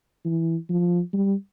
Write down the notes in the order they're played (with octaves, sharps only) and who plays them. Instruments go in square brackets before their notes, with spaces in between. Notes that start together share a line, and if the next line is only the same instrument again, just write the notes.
[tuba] E3
F3
G3